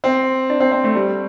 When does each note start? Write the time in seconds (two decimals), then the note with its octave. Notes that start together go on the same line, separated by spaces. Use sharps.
0.04 C4
0.50 D4
0.60 C4
0.72 C4
0.84 A3
0.95 G3